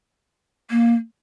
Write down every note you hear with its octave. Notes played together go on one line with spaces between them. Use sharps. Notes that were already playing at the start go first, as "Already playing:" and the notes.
A#3